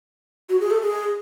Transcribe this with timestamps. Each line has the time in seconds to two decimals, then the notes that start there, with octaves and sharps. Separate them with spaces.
0.49 F#4
0.61 G#4
0.70 A4
0.82 G#4